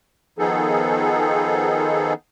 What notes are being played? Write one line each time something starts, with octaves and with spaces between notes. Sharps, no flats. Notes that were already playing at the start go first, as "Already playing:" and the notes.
D#3 F3 B3 D#4 G#4 A4